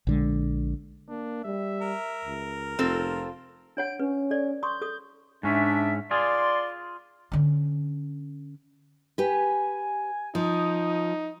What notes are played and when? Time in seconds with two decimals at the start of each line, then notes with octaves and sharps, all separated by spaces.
0.07 A#1 D3 G#3
1.09 A#3 D4
1.45 G3 E5
1.82 A#4
2.25 C#2
2.79 F1 C4 F4 A4
3.77 D4 C#5 F#5 D7
4.00 C#4 B4
4.31 A4 D5
4.63 C6 C#6 D#6 G6
4.82 A4 D#6
5.43 G#2 C#4 D4 E5
6.11 F4 G#4 D5 C6
7.32 D3 C#4
9.18 G4 B4 G#5
10.35 F3 D#4 D#6